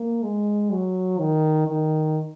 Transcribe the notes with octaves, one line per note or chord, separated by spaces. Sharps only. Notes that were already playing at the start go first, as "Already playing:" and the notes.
Already playing: A#3
G#3
F#3
D#3
D#3